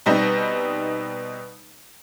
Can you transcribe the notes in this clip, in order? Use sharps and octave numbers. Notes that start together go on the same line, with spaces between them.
B2 G3 C4 D#4